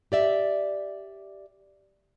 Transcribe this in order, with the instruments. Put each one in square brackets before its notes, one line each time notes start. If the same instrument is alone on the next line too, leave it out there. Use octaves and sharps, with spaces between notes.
[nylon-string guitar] G4 D5 E5